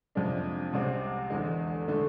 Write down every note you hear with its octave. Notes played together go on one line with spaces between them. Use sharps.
F2 C3 G#3 D4
C2 C3 G#3 C4
E2 D3 G#3
D3 A3